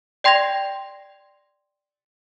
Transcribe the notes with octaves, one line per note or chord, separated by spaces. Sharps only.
D5 G5 C6 G#6 A#6 F7